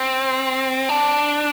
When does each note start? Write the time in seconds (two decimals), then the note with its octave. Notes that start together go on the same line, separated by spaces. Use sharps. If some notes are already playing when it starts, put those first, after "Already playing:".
Already playing: C4
0.89 D4